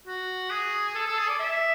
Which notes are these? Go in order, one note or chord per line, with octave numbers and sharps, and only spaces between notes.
F#4
G#4
A4
A4
G#4
D5
E5